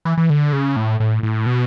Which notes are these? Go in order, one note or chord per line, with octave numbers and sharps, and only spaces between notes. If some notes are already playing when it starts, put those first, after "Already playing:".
E3
E3
D3
C#3
A2
A2
A2
B2